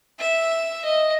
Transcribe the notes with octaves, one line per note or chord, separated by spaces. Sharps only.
E5
D#5